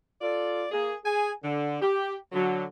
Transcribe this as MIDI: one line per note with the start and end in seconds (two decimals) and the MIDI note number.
0.21 0.67 65
0.21 0.67 69
0.21 0.67 74
0.71 0.93 58
0.71 0.93 68
1.05 1.31 68
1.05 1.31 80
1.44 1.80 50
1.80 2.15 67
2.32 2.64 50
2.32 2.64 54